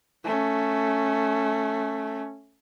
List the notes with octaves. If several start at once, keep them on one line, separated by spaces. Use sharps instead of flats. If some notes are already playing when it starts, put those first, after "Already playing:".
A3 C#4